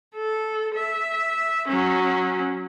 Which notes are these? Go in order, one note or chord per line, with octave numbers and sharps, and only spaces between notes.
A4
E5
F#3 C#4